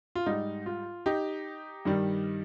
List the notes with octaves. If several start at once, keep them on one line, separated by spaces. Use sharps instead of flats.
F4
G#2 G3 D#4
F4
D#4 G4
G2 D#3 G3